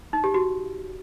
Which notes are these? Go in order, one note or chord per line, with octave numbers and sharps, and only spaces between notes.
D#4
G4
F#4